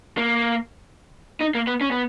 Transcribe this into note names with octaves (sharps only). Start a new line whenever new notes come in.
A#3
D#4
A#3
B3
C#4
B3